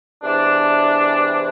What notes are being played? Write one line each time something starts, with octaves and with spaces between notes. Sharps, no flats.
E2 C3 E3 D4